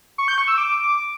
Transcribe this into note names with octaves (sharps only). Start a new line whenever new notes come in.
C#6
G6
C#6
E6
D6